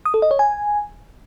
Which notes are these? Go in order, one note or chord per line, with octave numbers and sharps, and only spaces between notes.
D#6
A4
D#5
C#5
G#5